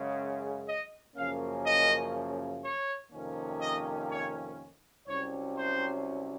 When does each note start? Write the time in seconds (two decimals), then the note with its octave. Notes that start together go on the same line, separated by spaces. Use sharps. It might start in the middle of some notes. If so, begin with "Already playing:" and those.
Already playing: F#2 C#3 G#3
0.67 D#5
1.15 F#2 C#3 F3 A#3 C#4 F5
1.65 D#5
2.63 C#5
3.12 F2 C3 D#3 A#3 C#4
3.61 D#5
4.10 C#5
5.07 C2 C3 F#3 C#4 C#5
5.57 C5